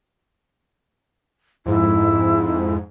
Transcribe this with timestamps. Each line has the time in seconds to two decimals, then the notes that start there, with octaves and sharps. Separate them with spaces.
1.66 F2 G#2 E4